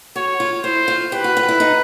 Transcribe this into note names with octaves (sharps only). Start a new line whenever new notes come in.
F#4 C#5
F4
E4 C5
F4
G4 B4
F#4
F4
E4
D#4